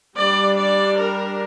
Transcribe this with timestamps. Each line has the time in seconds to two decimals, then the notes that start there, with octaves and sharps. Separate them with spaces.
0.17 G3 D4 D5
0.58 D5
0.98 A#4